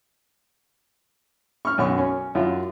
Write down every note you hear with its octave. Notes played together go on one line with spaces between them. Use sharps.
C#6 F6
B1 F#2 C#6
C#4
F#2 E4 F4